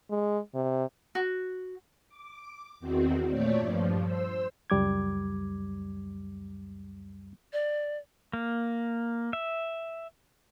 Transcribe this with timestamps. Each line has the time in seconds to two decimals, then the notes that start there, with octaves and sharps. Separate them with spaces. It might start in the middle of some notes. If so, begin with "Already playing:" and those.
0.10 G#3
0.55 C3
1.15 F#4
2.09 D6
2.80 E2 D#3 C4 F#4
3.27 A#2 A3 C#5 D5 G6
3.57 G2 F3
4.04 C5 E6
4.70 C#2 F#2 G3 D6 G#6
7.53 D5
8.33 A#3
9.33 E5